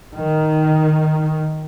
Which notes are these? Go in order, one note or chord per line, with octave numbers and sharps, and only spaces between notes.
D#3